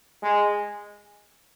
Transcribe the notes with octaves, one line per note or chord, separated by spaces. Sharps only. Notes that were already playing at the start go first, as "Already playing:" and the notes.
G#3